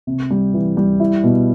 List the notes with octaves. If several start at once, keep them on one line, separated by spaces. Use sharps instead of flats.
C3
G3
E3
G3
E4
B2